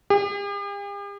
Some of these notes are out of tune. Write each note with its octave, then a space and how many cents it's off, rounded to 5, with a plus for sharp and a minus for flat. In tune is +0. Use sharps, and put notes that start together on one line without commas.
G4 +45